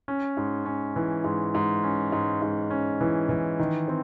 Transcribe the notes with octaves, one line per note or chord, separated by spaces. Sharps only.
C#4
G#2
C#4
E3
G#2
G#2
C#4
G#2
G#2
C#4
E3
E3
D#3
C4